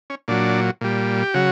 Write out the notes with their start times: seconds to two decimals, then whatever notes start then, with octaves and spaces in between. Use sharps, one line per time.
0.10 C#4
0.28 A#2 F#3 D4
0.81 A#2 G3
1.23 G4
1.34 C#3 F#3 F#4